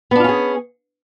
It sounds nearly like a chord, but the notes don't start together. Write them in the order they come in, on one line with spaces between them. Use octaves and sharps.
B3 D4 F4 C#4 G#4